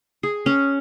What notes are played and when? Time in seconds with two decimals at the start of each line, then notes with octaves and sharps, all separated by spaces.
0.23 G#4
0.46 C#4